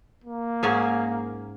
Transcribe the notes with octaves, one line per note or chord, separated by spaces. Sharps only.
A#3
G#2 C#4 G#4